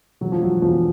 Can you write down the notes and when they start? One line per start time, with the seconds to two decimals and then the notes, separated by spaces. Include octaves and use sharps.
0.21 E1 F#3
0.32 F3
0.42 F#3
0.62 E2 F3